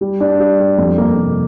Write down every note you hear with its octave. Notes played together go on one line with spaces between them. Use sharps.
G3
D4
G3
G3
F2
A#3
C3